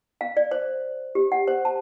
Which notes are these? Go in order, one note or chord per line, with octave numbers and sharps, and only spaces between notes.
F5
D5
C5
G4
F#5
C5
A5